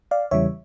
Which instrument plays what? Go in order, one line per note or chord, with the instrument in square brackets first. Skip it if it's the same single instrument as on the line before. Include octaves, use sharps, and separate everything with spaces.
[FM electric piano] D5 F5
E2 C#3 E3 G3 C#5 E5